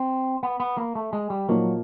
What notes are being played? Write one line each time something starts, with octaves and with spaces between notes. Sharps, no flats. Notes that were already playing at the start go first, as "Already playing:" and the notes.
Already playing: C4
B3
B3
A#3
A3
G#3
G3
A#2 F3 F#3 A#3 D#4